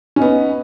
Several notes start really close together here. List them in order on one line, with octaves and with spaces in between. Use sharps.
C#4 D#4 B3